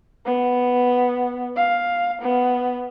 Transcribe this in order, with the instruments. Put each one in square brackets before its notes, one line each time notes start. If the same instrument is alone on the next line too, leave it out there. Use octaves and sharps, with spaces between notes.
[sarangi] B3
F5
B3